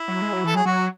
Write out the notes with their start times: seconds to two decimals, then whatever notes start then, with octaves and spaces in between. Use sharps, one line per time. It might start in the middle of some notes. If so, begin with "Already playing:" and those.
Already playing: E4
0.08 F#3
0.22 G#3
0.33 F#3
0.44 E3 A4
0.54 F#3 G#4
0.65 F#3 F#4